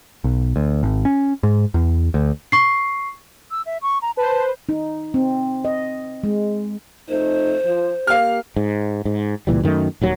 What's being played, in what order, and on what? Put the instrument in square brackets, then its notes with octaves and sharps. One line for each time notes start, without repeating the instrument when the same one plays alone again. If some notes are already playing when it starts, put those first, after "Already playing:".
[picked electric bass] B1
D2
G#1
C#4
G#2
E2
D2
[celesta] C#6 C7
[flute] E6
E5
C#6
A#5
[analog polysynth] B4 C5 [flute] A5
[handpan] D#4
C4
D#5
G#3
[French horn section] F2 A3 D#4 [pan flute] C5
[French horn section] F3
[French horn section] A#3 G4 [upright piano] F5 F6
[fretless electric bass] G#2
G#2
C#2 A#2 E3 G3
F#2 D#3 A3
D#1 D#2 F#3